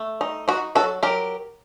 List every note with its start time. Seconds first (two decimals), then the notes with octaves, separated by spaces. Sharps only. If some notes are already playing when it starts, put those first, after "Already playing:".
Already playing: A3
0.21 D#4
0.48 D#4 F#4
0.75 F#3 F#4 A4
1.03 F#3 G4 A#4